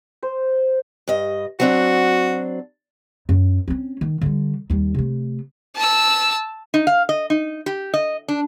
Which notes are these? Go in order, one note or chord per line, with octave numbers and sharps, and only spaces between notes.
C5
G2 D#5
F#3 C4 D4 F#4
F#2
C4 C#4
D#3
D3 G3
D#2 G3
C3 A3
A5 E6
D#4
F5
D#5
D#4
G4
D#5
D4